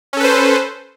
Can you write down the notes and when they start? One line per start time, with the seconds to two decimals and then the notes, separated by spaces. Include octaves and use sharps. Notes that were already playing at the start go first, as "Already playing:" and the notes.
0.13 C#4
0.17 A4
0.20 B4
0.24 C5